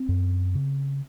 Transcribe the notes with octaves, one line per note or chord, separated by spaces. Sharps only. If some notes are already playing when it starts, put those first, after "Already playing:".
Already playing: C4
F#2
C#3